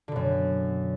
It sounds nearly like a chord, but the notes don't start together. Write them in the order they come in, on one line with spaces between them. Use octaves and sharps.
D3 B2 F#2